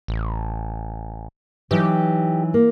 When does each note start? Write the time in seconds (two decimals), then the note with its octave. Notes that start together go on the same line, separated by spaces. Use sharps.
0.08 A1
1.71 E3 F#3 D#4 G4
2.54 A#3